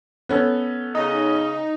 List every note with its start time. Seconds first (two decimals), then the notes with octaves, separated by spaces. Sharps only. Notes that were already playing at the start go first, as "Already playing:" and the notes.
0.29 B3 C#4 A4
0.95 C#3 D#4 D#5